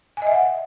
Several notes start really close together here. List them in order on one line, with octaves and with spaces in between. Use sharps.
G#5 D#5 E5 F#5